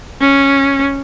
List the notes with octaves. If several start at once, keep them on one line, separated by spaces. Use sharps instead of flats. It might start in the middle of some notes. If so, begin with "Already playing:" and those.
C#4